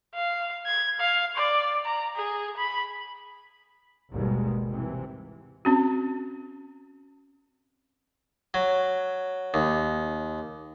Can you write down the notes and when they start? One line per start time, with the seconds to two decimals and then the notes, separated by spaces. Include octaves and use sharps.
0.15 F5
0.66 G#6
1.00 F5
1.36 D5
1.85 A#5
2.16 G#4
2.57 B5
4.13 G#1 D#2 B2 G3 G#3
4.70 C3 E3
5.65 C4 C#4 F#4
8.54 F#3
9.54 D#2